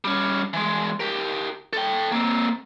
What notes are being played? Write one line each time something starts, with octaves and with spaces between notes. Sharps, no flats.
G3 C#4
E3 G#3
G4 A#4
A4 G5
A#3 C4